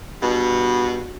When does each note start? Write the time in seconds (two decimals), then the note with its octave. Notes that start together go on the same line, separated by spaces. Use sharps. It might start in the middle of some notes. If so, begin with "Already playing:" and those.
0.22 G2 B2